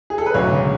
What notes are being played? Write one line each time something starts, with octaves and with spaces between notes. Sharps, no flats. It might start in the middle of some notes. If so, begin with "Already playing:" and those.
G#4
A4
B4
E1 D2 C#3 F#3 C#5